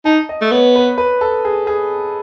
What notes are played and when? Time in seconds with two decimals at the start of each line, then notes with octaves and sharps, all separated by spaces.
0.05 D#4 A5
0.29 D#5
0.42 A3
0.51 B3 C#5
0.76 B4
0.98 B4
1.21 A4
1.45 G#4
1.67 G#4